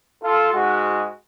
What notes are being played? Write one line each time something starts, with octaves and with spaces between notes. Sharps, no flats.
F4 A4
G#2 G#3 F#4